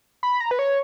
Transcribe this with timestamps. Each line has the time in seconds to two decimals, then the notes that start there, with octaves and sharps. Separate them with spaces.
0.23 B5
0.40 A#5
0.51 B4
0.59 C#5